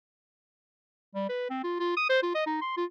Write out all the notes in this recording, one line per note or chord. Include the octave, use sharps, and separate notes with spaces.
G3
B4
C4
F4
F4
D#6
C5
F4
D#5
D#4
C6
F4